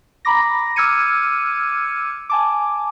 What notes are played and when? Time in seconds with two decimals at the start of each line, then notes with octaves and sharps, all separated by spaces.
0.25 A#5 B5 D6 A#6
0.76 D6 E6 F6 G#6 C#7 D#7
2.30 G#5 A5 D6